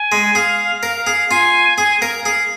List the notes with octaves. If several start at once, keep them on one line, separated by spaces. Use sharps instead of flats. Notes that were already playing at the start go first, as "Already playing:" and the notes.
Already playing: G#5
G#3
G#4 F5
A#4
G#4
F4 G#5
G#4 G#5
A#4 F5
G#4 F5